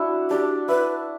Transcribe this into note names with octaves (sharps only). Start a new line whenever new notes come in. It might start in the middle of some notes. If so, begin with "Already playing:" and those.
Already playing: D4 E4 F#4
D4 G4
E4 B4